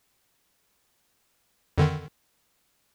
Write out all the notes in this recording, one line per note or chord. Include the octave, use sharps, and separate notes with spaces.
F2 D3 D#3